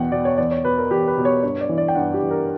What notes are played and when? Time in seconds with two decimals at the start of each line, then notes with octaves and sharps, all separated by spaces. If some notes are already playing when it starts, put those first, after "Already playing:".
Already playing: E2 B2 F#5 G5
0.12 B2 D5
0.25 C#5
0.38 E2 D5
0.51 C#5
0.64 B2 B4
0.78 A#4
0.91 E2 G4
1.08 B4
1.17 B2
1.25 C#5
1.43 G2 C#5
1.61 D5
1.69 E3
1.78 D5
1.88 G5
1.95 G2 F#5
2.14 G4
2.22 E3
2.31 A#4